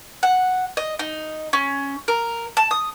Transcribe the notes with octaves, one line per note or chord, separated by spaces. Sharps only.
F#5
D#5
D#4
C#4
A#4
A5
D#6